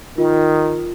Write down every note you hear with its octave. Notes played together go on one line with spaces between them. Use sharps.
D#3 F4